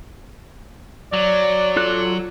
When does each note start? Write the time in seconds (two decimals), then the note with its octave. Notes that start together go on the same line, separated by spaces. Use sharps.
1.13 F#3 D5
1.76 F4 A4 F#6